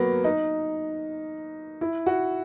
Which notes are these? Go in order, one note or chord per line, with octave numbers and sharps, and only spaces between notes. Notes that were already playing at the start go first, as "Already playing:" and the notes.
Already playing: F#3 A#3 B3
D#4
E4
F#4